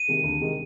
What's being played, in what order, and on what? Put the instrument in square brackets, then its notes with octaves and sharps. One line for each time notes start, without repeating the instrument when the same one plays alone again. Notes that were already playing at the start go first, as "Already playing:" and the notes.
Already playing: [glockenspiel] D#7
[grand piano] C3 D#3 G#3
D2
C3 D#3 G#3